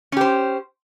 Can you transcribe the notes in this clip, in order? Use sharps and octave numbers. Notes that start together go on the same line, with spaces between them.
C#4 G4 C5